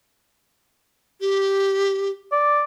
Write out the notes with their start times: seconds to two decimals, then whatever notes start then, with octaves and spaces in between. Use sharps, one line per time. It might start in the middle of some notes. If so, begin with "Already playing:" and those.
1.21 G4
2.32 D5